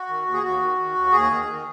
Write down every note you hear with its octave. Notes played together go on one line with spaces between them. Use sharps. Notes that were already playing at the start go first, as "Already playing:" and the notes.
Already playing: F#4
D#3
D#2
G#4
D#2 F#4
D#3
D#3
D#2
D#2 G#4
D#3
D#3